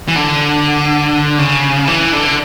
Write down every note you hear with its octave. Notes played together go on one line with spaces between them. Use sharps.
E3
D3
C#3
E3
D3